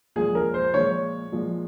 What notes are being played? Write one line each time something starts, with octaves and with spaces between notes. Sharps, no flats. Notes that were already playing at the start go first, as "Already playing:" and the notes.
A#2 F3 G#3 G#4
A#4
C5
A#2 F3 G#3 C#5
A#2 F3 G#3